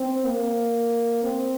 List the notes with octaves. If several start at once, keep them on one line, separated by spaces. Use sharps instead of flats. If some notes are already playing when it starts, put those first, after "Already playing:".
Already playing: C4
A#3
C4